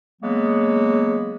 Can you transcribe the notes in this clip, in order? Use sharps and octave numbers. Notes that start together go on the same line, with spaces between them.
C#3 F#3 G#3 A#3 B3